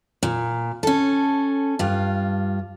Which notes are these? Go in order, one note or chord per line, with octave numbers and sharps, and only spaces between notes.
A#2
C#4 A4
G2 F4